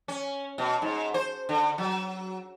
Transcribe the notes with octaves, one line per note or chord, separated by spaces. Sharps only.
C#4
B2
G#2
C5
D3
F#3